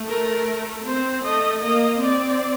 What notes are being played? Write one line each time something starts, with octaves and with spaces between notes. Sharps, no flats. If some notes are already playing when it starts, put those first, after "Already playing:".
Already playing: A3
A#4
C4 C5
A3 D#5
A#3 D#5
C4 D5